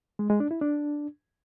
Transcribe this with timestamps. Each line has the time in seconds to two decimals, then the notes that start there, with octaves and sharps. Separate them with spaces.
0.19 G#3
0.30 G#3
0.40 D4
0.51 E4
0.61 D4